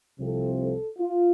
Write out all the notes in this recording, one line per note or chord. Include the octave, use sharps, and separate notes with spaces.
C2 C3 F3 C4 A4
A4
F4